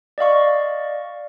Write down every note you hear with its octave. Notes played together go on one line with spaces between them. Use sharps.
D5 D#5 F5 C#6